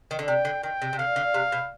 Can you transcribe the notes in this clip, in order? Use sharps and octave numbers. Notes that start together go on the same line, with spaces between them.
D#3
D3
C3 G5
D3
D#3 G5
C3
C3
D3 F5
D3
C3
B2